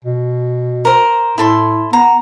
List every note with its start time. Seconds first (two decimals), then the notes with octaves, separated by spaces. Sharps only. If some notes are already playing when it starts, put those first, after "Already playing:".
0.04 B2
0.85 A#4 C5
1.38 A2 E4 A4 C6
1.93 B3 A#5